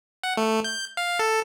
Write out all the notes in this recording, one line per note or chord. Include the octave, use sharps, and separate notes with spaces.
F#5
A3
G6
F5
A4